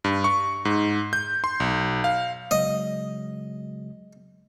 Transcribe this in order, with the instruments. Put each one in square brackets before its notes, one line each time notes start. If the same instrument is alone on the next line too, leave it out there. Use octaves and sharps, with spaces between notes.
[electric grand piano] G2
C#6
G#2
G6
C6
B1
F5
[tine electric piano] C#3 F#3 G#3 [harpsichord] D#5